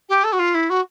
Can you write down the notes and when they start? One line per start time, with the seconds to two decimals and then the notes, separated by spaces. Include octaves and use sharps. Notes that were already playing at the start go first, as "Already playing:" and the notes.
0.09 G4
0.23 A4
0.32 F#4
0.39 F4
0.54 E4
0.69 F#4